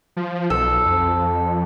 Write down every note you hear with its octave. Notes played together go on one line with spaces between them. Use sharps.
F3
B1 A4
F2